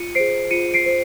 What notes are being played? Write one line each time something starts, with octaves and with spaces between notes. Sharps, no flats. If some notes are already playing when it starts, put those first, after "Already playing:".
Already playing: F4 C#7 D#7
G#4 C5 C7 D7
F4 C#7 D#7
C7 D7
C5